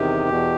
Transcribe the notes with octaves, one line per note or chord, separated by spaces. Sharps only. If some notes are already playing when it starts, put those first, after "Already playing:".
Already playing: E2 C3 D#3 G4
E2 B2